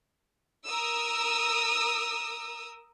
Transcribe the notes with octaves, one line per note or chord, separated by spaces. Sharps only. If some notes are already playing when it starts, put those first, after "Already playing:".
A#4 D#6 E6